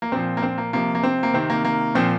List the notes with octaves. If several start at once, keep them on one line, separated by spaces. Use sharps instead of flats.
A#3
A#2 F3 C4
A#3
C4
A#3
C3 F3 A#3
A#3
C4
A#3
C3 D#3 C4
A#3
A#3
A#2 F3 C4